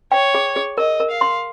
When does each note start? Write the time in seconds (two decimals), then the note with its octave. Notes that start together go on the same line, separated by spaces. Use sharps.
0.12 C#5 G5
0.35 G#4
0.56 G#4
0.78 A#4 D#5
1.00 A#4
1.10 F5
1.21 C6